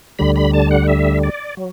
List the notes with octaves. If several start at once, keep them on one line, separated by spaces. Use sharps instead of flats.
D2 D3 G3 B5
B5
A5
F#5
E5
D5
F#3